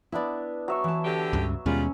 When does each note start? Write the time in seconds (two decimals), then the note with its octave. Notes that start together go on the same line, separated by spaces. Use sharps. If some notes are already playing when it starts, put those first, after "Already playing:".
0.12 B3 D4 E4 D5 E5
0.68 F#3 E5 C#6
0.84 E3 A5
1.05 D3 G4
1.33 C#2 G2 C#3
1.66 D#2 B2 D#3 G3 G#3 C#4 F4